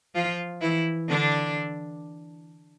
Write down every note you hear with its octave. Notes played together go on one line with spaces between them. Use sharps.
F3 F4
E3 E4
D3 D4